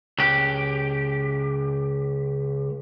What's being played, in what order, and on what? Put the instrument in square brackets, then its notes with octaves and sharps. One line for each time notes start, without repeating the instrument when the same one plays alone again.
[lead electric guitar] C#2 G4